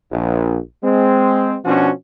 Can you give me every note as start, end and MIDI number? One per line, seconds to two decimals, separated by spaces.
0.12 0.58 34
0.84 1.57 56
0.84 1.57 60
1.65 1.91 47
1.65 1.91 53
1.65 1.91 61
1.65 1.91 62
1.65 1.91 66